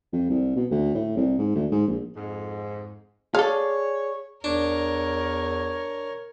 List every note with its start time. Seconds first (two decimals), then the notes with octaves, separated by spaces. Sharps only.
0.13 F2
0.30 C2
0.56 B2
0.71 D2
0.95 A2
1.17 C2
1.39 G#2
1.55 D2
1.71 G#2
1.88 A#1
2.15 F2 G#2
3.35 G#4 A4 C#5 D5 F5
4.44 E2 D4 A#4 C#5